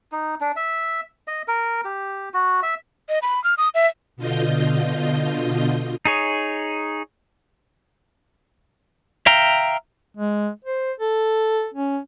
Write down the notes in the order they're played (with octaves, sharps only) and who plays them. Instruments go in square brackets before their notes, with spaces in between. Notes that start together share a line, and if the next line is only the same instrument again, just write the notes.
[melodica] D#4
D4
E5
D#5
A#4
G4
F#4
E5
[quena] D#5
B5
F6
D#6
E5
[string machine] B2 D3 F4 D#5 G6
[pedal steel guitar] D#4 G#4 C#5
E5 F5 G5 A#5
[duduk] G#3
C5
A4
C#4